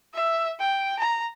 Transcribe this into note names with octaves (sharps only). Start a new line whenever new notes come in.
E5
G5
A#5